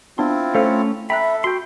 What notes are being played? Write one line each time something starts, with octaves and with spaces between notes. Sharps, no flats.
B3 C4 D4 E4 F4 C6
A3 C#4 A4 C5 F5
A4 E5 G5 A#5 B5 F#6
F#4 G5 C6